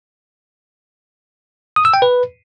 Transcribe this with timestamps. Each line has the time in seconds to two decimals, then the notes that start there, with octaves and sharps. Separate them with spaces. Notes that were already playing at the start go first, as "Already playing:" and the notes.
1.76 D#6
1.85 E6
1.94 G5
2.02 B4